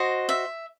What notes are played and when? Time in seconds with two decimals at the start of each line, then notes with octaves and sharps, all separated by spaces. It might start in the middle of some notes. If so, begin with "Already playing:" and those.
Already playing: F#4 C5 D#5
0.29 E5